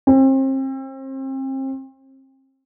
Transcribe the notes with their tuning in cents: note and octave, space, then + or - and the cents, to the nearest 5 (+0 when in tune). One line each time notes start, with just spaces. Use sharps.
C4 +35